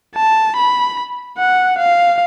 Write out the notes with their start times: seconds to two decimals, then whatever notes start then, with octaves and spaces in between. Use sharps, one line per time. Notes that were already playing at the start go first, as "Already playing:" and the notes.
0.15 A5
0.56 B5
1.38 F#5
1.78 F5